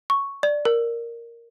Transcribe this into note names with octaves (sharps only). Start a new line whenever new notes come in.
C#6
D5
A#4